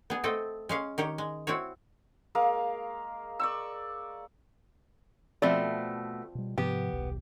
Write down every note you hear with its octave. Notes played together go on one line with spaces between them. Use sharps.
B3 G#4
A3 C4 A4 D#5 G5
G#3 C#4 F5
D#3 G4 C#5
G#3
C4 E4 F#4 C#5
G#3 A#3 F5
D5 C#6 E6
B2 F3 A3 C4 D5
B2 G3
G#2 C3 F3 B3 G4
D#1 B1